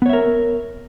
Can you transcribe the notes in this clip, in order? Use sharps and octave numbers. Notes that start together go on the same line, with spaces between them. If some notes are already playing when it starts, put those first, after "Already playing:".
B3 A#4 C#5 E5